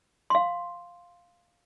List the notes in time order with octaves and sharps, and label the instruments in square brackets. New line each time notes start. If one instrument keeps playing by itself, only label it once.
[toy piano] F5 C6